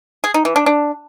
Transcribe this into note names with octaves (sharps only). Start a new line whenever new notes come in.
G#4
D#4
E3
D4
D4